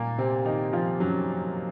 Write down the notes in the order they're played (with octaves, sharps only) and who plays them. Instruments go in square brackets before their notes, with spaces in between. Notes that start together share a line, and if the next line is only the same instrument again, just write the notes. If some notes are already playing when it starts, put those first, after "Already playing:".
Already playing: [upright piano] A#2 A#3
C3 C4
D#3 D#4
F3 F4
F#2 F#3